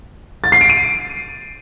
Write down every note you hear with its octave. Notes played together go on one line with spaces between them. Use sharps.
A6
C7
D7
D#7